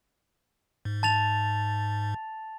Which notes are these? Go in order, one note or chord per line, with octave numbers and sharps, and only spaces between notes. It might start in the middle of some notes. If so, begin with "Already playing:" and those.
G#2
A5 A6 F7